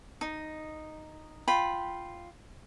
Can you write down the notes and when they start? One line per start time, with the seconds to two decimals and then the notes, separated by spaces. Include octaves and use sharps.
0.21 D#4
1.48 F4 G5 B5